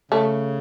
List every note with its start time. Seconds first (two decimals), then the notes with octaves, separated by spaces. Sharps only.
0.12 C#3 A3